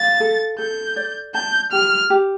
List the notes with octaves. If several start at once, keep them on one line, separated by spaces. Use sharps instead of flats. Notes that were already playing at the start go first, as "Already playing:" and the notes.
Already playing: F5 A6
A4
A4 G6
D5
A5 G6
G4 F6
G4